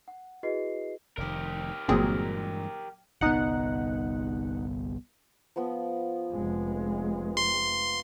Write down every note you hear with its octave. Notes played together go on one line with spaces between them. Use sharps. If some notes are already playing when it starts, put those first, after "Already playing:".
F#5
E4 F#4 G#4 B4 D#5 C7
F1 D#3 G4 A#4
G1 G2 A#2 E3 F#3 G#3 C4 G#4
G1 C2 B3 D#4 F#5
F3 B3
F1 G#3
C6